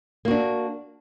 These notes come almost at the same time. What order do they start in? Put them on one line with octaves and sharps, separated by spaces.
A#3 F#4 D4